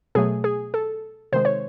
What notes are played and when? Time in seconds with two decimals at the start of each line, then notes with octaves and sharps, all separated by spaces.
0.15 B2 F#3 A3 G#4
0.44 G#4
0.74 A4
1.32 C3 D#3 G#3 C5
1.45 C#5